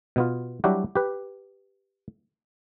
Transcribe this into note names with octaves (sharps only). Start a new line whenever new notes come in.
B2 B3 F4
F#3 G3 D4 E4 F#4 G4
G4 B4